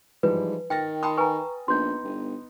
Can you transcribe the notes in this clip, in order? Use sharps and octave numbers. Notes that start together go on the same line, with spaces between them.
G#2 E3 F3 G3 B4
D#3 G5 F6 A6 A#6
G5 A5 B5 C6 D#6
B4 G#5 A#5 C#6
A#1 B3 D#4 C6 G6
G1